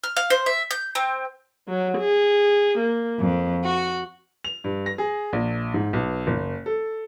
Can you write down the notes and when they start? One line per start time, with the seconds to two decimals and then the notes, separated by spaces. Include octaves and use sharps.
0.04 F6
0.17 F5
0.30 C5
0.46 E5
0.71 G6
0.95 C4
1.68 F#3
1.97 G#4
2.79 A#3
3.19 F2
3.64 F#4
4.44 F7
4.64 G2
4.86 A#6
4.98 G#4
5.33 A#1
5.74 G#2
5.93 B1
6.27 F#1
6.66 A4